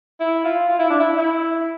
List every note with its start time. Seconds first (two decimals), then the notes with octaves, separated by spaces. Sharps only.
0.20 E4
0.44 F4
0.68 F4
0.79 E4
0.90 D4
1.00 E4
1.17 E4